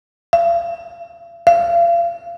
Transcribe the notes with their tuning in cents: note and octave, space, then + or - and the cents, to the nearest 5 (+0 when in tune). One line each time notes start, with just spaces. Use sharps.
F5 -45
F5 -35